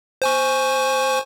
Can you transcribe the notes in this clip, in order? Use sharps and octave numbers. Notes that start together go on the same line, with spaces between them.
C5 G#5 C#6